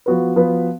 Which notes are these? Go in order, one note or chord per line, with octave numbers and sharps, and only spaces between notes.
F3 B3 F#4 B4
F3 B3 F#4 B4